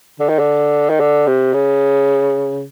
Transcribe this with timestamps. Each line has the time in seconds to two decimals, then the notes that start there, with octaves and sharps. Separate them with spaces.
0.20 D3
0.29 D#3
0.39 D3
0.89 D#3
1.00 D3
1.27 C3
1.53 C#3